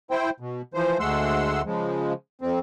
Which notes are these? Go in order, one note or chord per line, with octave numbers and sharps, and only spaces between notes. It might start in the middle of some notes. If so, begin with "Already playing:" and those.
E4 C5 G5
B2
E3 F3 C5
D2 G#3 A3 F#5 C6 E6
C#3 F3 G#3
F2 C4